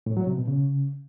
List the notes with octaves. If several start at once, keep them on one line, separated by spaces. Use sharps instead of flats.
A2
F#3
C3
B2
C#3